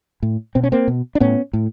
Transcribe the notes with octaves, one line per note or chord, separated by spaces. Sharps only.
A2
B2 C4
C#4
A#3 C4
B2
D4
A2 B3 C#4
A2